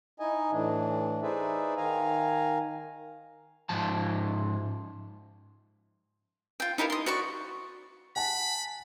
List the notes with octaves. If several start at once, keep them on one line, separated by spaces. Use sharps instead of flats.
D#4 E4 D#5 G#5
A2 E3 D4
D#4 G#4 B4 C5 D5 E5
D#3 F5 G#5 A#5
G#2 F3 A5
F4 G5
D#4 E4 G4 A#4
C6 D#6
F#4 D5 C#6
F#5 G#5 A5 B5